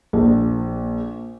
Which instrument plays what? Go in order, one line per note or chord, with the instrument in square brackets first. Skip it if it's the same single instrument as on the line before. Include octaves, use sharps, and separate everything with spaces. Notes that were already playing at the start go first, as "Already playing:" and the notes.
[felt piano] A#1